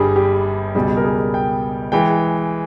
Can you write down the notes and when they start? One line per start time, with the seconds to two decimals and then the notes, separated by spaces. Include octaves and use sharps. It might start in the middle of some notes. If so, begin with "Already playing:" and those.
Already playing: G1 G2 G3 G4 G#4
0.16 G4
0.75 C#2 B2 G3 G#4
0.97 A#4
1.04 G#4
1.34 G5
1.92 E3 G#3 G5